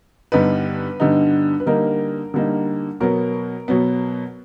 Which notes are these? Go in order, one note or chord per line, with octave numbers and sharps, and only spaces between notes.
G2 D3 G3 B3 D#4 B4
G2 D3 G3 B3 D#4
B4
D3 G3 A#3 D#4 A#4
D3 G3 A#3 D#4
B2 F#3 B3 A#4
B2 F#3 B3